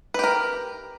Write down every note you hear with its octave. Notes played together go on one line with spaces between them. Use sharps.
G4 A#4 B4